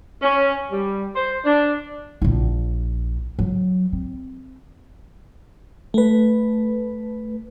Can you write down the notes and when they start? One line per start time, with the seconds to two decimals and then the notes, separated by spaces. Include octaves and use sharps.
0.22 C#4
0.71 G3
1.16 C5
1.45 D4
2.22 A#1 E4
3.39 F#3
3.93 C4
5.94 A3 B4